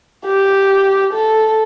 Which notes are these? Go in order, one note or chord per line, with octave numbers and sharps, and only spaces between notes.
G4
A4